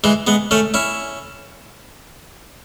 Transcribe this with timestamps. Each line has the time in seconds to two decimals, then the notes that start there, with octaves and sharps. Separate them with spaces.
0.04 E3 G#3
0.27 G#3 B3
0.51 A3 C#4
0.74 C#4 E4